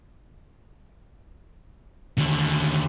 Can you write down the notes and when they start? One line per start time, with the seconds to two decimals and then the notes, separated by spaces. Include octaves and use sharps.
2.18 D#2 D3